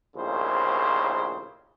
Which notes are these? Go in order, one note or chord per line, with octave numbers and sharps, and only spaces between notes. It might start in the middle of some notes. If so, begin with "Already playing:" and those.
A#1 D#2 A2 C#3 C5